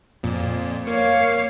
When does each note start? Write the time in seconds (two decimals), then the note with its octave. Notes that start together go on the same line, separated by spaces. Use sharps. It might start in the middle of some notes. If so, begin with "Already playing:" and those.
0.23 F2 A#2
0.87 A#3 C#5 F5